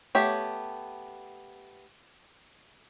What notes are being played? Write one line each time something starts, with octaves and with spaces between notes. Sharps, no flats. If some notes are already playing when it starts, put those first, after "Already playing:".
A3 B3 G4 C#5